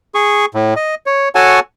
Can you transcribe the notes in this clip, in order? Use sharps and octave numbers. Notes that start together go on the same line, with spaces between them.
G#4 C#6
A2
D#5
C#5
F#4 A4 C#5 F#5 G#5 A5